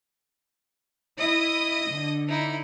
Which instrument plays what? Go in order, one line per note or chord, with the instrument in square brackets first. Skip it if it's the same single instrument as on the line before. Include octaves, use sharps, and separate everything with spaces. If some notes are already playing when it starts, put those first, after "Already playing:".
[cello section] E4 [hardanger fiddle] D#5 D#6
[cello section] D3
[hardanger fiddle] D#4 E4